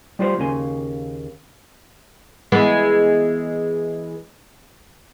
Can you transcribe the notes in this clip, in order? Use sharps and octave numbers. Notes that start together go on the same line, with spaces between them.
G3 F4 B4 C5
D#2 C#3 A#3 G#5 C6
E3 G#3 B3